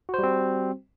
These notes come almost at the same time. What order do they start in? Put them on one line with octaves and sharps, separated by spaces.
F#4 C5 G3 C4